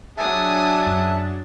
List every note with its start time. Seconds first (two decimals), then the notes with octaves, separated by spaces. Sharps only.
0.17 F#3 D4 G#4 E5 G#5 A5 D#6
0.83 F#2 A6